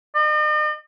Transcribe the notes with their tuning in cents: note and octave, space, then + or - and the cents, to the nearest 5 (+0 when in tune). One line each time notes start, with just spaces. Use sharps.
D#5 -45